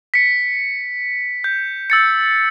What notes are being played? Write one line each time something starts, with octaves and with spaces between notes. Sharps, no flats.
B6 C#7
G6
E6 A6 C#7